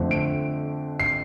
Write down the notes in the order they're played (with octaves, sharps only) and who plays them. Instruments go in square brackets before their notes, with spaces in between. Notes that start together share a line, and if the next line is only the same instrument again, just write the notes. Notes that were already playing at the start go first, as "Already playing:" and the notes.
Already playing: [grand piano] F2 D3 A3 C4
D7
C7